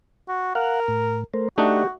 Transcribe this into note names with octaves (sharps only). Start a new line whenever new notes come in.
F#4
A#4 F5 F#5
A2
A3 A#4 C5
A3 D4 D#4 F#4 G4